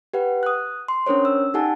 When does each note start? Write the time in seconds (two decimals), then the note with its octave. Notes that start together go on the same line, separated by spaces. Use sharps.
0.13 G4 B4 F#5
0.43 D#6 F#6
0.88 C6
1.06 C#4 D4 A#4 C5 C#5
1.25 E6
1.54 D#4 G4 A4 F#5 G#5 A5